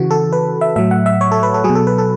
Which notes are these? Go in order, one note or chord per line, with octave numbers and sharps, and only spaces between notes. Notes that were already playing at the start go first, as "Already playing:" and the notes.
Already playing: C#3 E3 F#4
A4
B4
E5
A2 F#3 E5
F#5
E5
C#5
A4
B4
A4
F#3 G#4
B2
A4
B4
A4